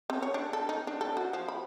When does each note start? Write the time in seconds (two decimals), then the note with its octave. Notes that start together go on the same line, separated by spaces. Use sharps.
0.10 C4
0.22 C#5
0.34 D4
0.53 A4
0.69 D#4
0.87 D4
1.01 A4
1.17 F#4
1.33 F3
1.48 B5